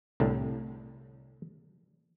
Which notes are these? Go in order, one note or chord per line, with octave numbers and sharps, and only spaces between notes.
C2 A2 D3